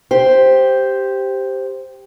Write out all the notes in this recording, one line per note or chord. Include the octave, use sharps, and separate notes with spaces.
G4 C5